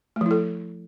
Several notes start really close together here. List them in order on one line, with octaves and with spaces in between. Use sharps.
A3 F3 E4 A4